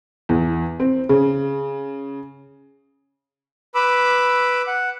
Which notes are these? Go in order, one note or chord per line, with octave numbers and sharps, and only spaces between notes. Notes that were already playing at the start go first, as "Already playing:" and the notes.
E2
C4
C#3
B4 B5 D6 E6
F#5